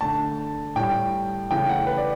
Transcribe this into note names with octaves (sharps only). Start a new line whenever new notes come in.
D3 A3 A5
A2 G3 G5
C#3 E3 A3 G5
F#5
B4
D5